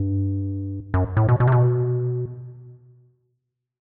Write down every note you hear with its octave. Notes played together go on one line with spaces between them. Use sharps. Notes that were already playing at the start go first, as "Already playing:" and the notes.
Already playing: G2
F#2
A2
B2
B2
C3
B2